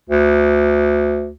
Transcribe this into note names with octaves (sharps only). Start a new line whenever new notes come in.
D2